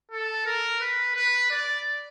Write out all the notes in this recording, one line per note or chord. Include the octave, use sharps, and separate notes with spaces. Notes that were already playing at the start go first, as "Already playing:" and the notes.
A4
A#4
B4
B4
D5